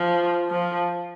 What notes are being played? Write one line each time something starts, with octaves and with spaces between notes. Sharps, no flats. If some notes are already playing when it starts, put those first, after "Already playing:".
Already playing: F3
F3